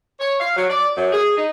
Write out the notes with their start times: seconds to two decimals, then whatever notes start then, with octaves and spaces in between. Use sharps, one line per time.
0.20 C#5
0.40 F5
0.56 F#3
0.70 D5
0.96 F#2
1.12 G#4
1.37 D#4